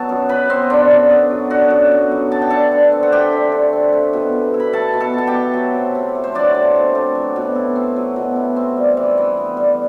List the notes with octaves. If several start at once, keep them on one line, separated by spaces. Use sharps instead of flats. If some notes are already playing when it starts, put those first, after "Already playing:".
Already playing: F#3 B3 E5 A5
F#2
F#2 B4 B5
B3 C4 C5
D3 D4 D5
F#2
B3
F#3
D3 F#4 F#5
F#2
B3
F#3
A3 A5
G5
D3 A4 A5
D3
C4
F#5
A3 G4 G5
D3
D3
C4
A3
B2
B2
E4
B5
A3 A4 A5
B2
A4 A5
B2 A5
G4 G5
E4
F#3
C3
C3
A3
C5
F#3 D4 D5
C3
C3
A3
F#3
B2
E4
C4
F#3
B2
E4
C4
G3
E3
E3
B3
G3